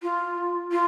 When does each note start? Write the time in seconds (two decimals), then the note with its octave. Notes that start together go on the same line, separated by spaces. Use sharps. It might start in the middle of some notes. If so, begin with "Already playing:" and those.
0.03 F4
0.72 F4